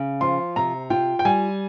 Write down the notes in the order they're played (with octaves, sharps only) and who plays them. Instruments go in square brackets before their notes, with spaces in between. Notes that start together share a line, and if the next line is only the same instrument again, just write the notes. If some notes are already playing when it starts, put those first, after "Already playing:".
Already playing: [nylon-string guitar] C#3
[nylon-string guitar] F3 [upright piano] C6
[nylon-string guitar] C3 [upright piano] A#5
[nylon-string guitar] F4 [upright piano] G5
[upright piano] G5
[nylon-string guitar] G3 [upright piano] G#5